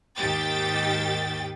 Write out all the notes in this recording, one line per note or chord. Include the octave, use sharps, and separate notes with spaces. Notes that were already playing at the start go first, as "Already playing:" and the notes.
D#2 G#2 D#3 G4 G5 A6